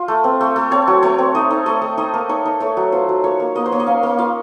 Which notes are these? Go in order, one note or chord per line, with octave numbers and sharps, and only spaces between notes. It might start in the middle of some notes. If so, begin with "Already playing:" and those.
Already playing: F4
A3
C4
A3
A3
C4 C#5
F#3
A3 C#5
C4
D#4 D#5
D#4
A3 D#5
A3
D#4 D#5
A#3
D#4 C#5
D#4
A3 C#5
F#3
F4 C5
F#3
A#3 C#5
A#3
A#3 D#5
C5
A#3 C#5
D#5
C#4 F5
A#3
F4 F5